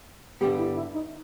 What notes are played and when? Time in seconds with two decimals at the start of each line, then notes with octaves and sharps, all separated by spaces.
0.41 G2 D3 G3 B3 G4
0.58 E4
0.76 E4
0.94 D#4